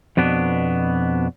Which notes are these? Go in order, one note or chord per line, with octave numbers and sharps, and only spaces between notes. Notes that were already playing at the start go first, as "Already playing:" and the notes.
F2 B2 B3 D4